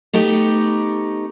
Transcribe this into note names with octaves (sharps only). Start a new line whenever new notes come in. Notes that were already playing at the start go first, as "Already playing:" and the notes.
A3 B3 D#4 G4